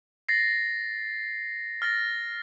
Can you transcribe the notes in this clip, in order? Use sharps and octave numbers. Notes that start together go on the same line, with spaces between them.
A6 A#6 C7
F6 A6 A#6